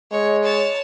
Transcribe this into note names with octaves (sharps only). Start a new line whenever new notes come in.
G#3 C#5
C#5 A5